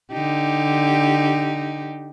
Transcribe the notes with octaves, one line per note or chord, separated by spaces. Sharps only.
D3 D#4 G4